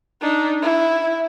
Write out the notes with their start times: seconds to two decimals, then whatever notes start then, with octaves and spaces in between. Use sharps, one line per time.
0.22 D4 D#4
0.62 E4